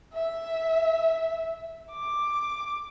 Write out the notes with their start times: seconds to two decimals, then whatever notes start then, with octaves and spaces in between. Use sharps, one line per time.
0.14 E5
1.92 D6